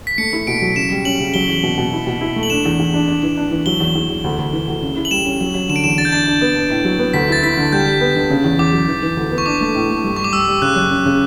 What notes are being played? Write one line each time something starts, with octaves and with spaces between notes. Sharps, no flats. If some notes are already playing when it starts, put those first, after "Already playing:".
B6
A3 C#7
E4
B2 D7
F#3
C#3 E7
G3
C#4 F#7
C#3
F#3 G7
E2
B2
B2
E4
B2
E4
A3
F#7
D4 E7
E2
E2
D4
D4
E3
D4
E3
F#3 G7
E2
E2
E2
D2
D2
E3
D2
C#3
E4
F#7
G3 E7
C#4
F#3
F#3
D3 E7
D7
E2 E7
D4 A6
G6
D4 A6
D4
B3
D4
A2
F#3
B3
D2 B6
E4 A6
E4 B6
D3
G3 G6
G3
B3
D3
C#3
E2
E2 D6
F#3
E3
E3
D2
B3
C#6
D4 D6
A3
A2
A3
G2
G2 C#6
D6
G3 E6
G3
C#3 F#6
F#2
C#3
C#3